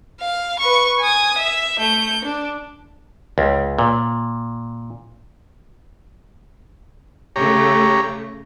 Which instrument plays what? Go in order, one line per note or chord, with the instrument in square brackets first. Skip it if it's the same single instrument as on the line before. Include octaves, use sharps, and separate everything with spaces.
[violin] F5
B4 C#6
G#5 D#6
E5
A3 G6
D4
[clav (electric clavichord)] C#2
A#2
[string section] C#3 A3 [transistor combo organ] G4 C#5 A#5